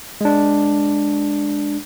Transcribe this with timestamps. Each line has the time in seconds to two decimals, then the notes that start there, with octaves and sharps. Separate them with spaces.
0.21 G#3 D4